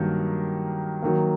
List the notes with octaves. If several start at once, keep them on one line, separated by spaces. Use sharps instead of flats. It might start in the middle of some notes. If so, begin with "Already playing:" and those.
Already playing: G2 D#3 F#3 A#3
D#3 F#3 A#3